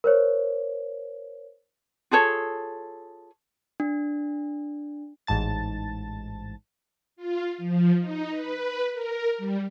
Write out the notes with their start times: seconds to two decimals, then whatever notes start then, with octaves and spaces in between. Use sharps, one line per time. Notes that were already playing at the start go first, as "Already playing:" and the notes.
0.04 A#4 C5 C#5
2.11 F4 G#4 A4 C#5
3.80 D4
5.27 A1 G#2 A5 A6
7.16 F4
7.58 F3
8.00 D#4
8.30 B4
8.92 A#4
9.38 G3